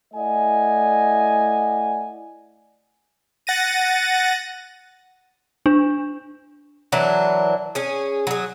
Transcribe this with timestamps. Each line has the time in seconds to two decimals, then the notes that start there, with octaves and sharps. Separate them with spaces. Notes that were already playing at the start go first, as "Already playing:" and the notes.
0.14 A3 E4 D5 D#5 F#5 G#5
3.47 F#5 A6 A#6 D#7
5.66 D4
6.92 E3 F#3 D4 A#4
7.75 C#4 G#4
8.27 F#3 G#4